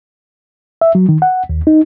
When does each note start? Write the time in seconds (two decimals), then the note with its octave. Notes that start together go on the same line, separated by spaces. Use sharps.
0.81 E5
0.95 F#3
1.09 D#3
1.22 F#5
1.49 D#2
1.67 D#4